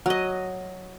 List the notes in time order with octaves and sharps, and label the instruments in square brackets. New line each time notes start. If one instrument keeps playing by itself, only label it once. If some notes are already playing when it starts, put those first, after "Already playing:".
[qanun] F#3 D#5